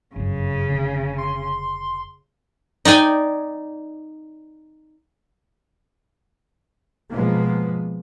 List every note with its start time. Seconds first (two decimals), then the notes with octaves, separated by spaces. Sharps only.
0.16 G1 F#2 C#3
0.69 F1 D3
1.18 C6
2.85 D#4 D5 G5 G#5
7.11 B2 F3 G#3 A#3 B3